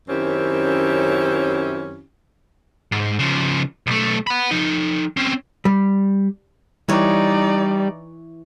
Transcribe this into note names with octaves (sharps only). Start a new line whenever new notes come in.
F#2 D#3 C4 C#4 E4 G4
G#2
C#3 F3
B1 A3
F#5 B5
F3 D#4
C4 C#4
G3
E3 G3 D#4 C#5 D5